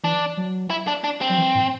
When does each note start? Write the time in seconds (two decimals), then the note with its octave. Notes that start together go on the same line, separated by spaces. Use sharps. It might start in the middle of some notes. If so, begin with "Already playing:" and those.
0.03 E3 D4
0.37 F#3
0.70 E4
0.87 D4
1.04 D4
1.21 C4
1.30 F#3
1.38 E3
1.55 A2